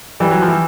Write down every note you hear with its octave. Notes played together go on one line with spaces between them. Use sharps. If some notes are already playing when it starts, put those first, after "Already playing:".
E3 G3
F#3
F3
E3